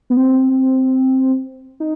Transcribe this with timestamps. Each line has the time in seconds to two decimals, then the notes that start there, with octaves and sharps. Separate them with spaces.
0.10 B3
0.17 C4
1.80 D#4